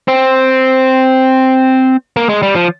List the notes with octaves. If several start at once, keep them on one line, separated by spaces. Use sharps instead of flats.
C4
A#3
G#3
G3
F3